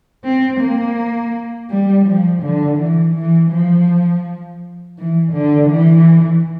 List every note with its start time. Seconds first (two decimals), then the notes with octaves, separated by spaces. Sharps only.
0.25 C4
0.61 A#3
1.70 G3
2.06 F3
2.43 D3
2.79 E3
3.16 E3
3.52 F3
4.98 E3
5.33 D3
5.70 E3